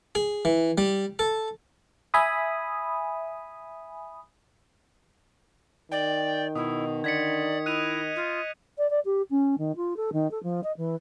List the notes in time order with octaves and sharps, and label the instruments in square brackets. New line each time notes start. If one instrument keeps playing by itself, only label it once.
[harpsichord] G#4
E3
G3
A4
[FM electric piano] E5 G#5 B5 D#6
[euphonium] D#3 [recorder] D5 [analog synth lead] G5
[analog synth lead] B2 [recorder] E4 [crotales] D#6
[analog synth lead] D3 [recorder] D5 [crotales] G#6 B6 C#7
[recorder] E4 [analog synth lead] D#5 [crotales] F#6 D#7 F7
[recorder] F4
[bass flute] D5
D5
G4
C#4
D#3
F4
A4
D#3
A4
F3
D#5
E3